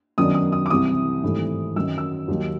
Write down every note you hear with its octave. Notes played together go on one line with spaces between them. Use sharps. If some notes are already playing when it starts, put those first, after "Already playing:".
F#2 D#3 F#3 B3 D4 D#6
D#6
D#6
D6
C2 C3 E3 D#6
G#1 G2 E3 A3
F#2 D#3 F#3 E6
E6
D#2 D#3 F#3